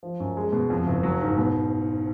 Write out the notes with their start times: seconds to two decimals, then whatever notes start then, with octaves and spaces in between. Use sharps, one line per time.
0.03 F3
0.20 F#2
0.37 G#3
0.53 B2
0.70 F2
0.86 F#1
1.03 F#3
1.21 G#2
1.38 B2